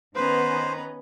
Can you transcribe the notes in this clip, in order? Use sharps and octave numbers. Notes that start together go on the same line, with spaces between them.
D#3 B3 C#4 B4 C5 A#5